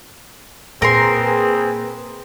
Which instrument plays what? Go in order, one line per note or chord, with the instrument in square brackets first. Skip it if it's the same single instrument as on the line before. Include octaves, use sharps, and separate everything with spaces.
[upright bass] A#2 [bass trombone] C4 [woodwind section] G#4 B4 [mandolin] A#4 A#5 C6